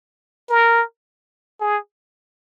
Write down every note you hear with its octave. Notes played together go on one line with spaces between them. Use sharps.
A#4
G#4